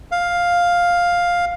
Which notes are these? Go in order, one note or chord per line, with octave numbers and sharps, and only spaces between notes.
F5